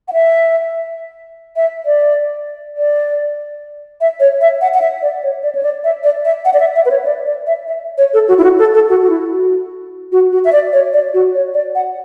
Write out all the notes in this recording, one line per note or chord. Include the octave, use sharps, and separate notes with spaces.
F#5
E5
E5
D5
D5
E5
C#5
E5
F#5
F#5
E5
D5
C#5
D5
C#5
D5
E5
D5
E5
F#5
D5
E5
E5
B4
C#5
D5
D5
E5
E5
C#5
A4
F#4
E4
F#4
A4
A4
F#4
F#4
E4
F#4
F#4
F#4
E5
D5
C#5
D5
F#4
C#5
D5
F#5